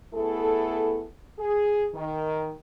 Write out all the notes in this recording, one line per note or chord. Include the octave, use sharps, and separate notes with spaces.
A3 B3 E4 G#4 A4
G#4
D#3